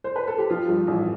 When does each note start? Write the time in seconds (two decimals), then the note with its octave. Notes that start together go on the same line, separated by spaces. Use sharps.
0.04 C5
0.16 B4
0.28 A4
0.38 G4
0.50 F3 F4
0.69 G2
0.87 A1